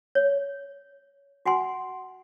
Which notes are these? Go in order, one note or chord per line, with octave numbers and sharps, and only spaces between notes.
C#5
F#4 F#5 G#5 C6